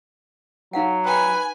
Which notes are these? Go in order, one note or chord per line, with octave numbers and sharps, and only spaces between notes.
F#3 D#4 F5 F#5
B4 G5 G#5